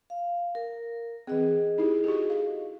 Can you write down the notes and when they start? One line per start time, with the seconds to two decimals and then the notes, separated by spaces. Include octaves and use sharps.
0.10 F5
0.55 A#4
1.27 E3 C4 G#4 D#5
1.78 D#4 E4 G4
2.04 F#4 G4 A4
2.30 F5